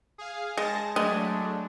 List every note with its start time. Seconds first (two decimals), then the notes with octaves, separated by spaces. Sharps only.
0.18 G#4 F5
0.57 G#3 A5 A#6
0.96 F#3 G#3 A3 D4